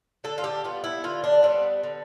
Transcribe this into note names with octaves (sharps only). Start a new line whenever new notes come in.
D3 A4
F4
G4
G3 B3 F4
E4
D3 F4
D4
G3 B3 C4
D3